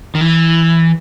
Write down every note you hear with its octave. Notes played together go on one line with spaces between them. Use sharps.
D#3
E3